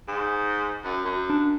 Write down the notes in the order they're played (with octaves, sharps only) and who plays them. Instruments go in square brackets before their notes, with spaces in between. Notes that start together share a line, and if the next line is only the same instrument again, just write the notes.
[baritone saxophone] G#2
F#2
F#2
[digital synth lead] D4